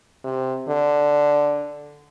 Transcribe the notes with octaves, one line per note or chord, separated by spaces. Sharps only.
C3
D3